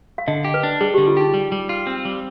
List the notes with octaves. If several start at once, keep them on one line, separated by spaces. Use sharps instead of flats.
F5
D3 D#5
G4
B4
D4
G3 G#4
D3 G4
F4
D#4 G4
G3
G3
F4
C4
G3